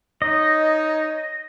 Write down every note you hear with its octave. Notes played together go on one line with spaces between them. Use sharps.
D#4 C#5 D#5